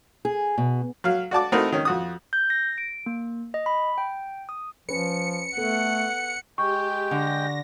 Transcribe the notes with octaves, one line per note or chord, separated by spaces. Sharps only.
G#4
B2
F#3 F5
F#4 D5 A5 D6
A3 C4 D#4 E4 F#4 A#4
D#3 C#4
F2 F#4 D#6
G6
A#6
D7
A#3
D#5
B5
G5
D#6
F3 C#4 B4 C#7
A3 B3 A4 F#5
G#3 G4 G5 C#6
D3 A#6